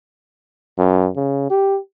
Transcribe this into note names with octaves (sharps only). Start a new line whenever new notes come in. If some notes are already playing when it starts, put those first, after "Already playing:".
F#2
C#3
G4